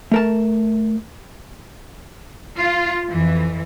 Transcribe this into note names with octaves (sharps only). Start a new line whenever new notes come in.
A3 A#4 A5
F4
F2 E3